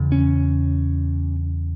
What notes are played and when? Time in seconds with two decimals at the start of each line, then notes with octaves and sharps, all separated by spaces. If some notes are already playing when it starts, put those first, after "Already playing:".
Already playing: E2 C#3
0.12 C#4